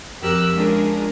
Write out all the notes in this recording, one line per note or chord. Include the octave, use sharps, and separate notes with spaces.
F2 G4 A#4 E6 F#6
G#3 C#4 D4 F4 G#4 A#4